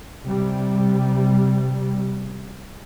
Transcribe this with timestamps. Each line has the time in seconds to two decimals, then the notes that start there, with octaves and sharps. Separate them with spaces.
0.24 C3 G3